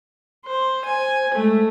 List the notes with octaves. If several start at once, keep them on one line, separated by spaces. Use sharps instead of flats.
C5
C5 G#5
G#3 A3